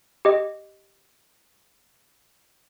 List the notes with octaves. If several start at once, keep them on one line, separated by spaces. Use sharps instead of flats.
G4 D#5 D6